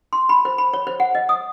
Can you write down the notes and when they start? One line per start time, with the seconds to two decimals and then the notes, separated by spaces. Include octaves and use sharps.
0.13 C6
0.29 B5
0.45 C5
0.58 B5
0.73 C#5
0.87 C5
1.00 F#5
1.15 D#5
1.29 D#6